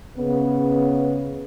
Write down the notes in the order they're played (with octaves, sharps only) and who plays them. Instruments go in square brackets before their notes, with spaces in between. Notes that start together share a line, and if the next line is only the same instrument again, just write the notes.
[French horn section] C#3 B3